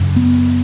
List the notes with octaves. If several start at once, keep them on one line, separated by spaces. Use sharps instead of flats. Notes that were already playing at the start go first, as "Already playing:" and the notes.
Already playing: F#2 C#3
B3